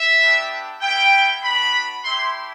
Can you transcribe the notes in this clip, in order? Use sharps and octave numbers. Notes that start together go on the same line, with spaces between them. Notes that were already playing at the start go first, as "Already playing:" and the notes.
Already playing: E5
B3 D4 G4
G3 B3 E4 G5
B3 D4 F#4 B5
A3 E4 G4 C6